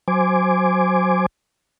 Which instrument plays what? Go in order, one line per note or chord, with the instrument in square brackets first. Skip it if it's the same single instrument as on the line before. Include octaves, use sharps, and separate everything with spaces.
[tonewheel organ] F#3 C5 G#5 D6